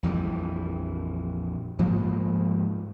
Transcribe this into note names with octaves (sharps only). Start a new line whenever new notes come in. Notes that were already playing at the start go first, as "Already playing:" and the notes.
A#1 F2 E3 G3
G#2 F3 G3 A#3